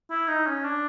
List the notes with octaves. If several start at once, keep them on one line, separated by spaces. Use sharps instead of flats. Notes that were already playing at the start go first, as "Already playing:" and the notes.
E4
D#4
C#4
D4